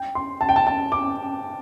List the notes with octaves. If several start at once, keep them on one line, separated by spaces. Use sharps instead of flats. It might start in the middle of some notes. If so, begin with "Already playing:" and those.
Already playing: G5
C6
A5
G5
A5
A5
D6